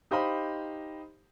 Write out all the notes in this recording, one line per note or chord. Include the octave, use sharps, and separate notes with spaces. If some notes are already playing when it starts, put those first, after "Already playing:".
D#4 G4 C5 D#5 F5 B5